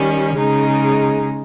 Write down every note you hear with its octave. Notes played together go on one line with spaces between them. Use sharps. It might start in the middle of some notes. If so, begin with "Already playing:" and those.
Already playing: D#3 G3 C#4
C#3 G#3 D#4